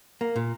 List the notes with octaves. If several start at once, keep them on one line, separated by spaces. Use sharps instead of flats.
A#3
A#2